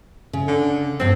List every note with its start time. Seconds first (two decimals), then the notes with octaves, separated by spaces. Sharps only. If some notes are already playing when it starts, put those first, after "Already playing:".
0.33 C#3
0.47 D3
1.00 E2 G2 C4